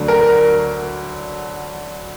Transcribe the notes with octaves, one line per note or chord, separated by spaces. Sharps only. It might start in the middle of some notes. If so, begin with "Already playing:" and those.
Already playing: D2 D3 F#3
A#4